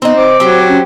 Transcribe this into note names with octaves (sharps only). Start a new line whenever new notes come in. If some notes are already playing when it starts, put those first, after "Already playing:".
B3 C4 D#4 D#5
C5 D6
F#3 C4 G4
C#4